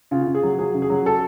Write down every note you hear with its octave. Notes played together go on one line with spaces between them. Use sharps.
C#3 F4
C#3
G#4
F#3
F#3 G#4
C#3
G#4
F#3
A4